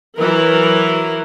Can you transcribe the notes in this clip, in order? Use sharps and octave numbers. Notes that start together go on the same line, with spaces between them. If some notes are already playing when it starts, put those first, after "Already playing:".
E3 F#3 A#4 B4